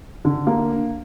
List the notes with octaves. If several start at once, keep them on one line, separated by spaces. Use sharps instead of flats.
D3
A#3